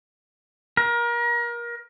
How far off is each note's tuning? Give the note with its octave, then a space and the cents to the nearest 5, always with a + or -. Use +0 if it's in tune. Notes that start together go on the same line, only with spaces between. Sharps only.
A#4 +30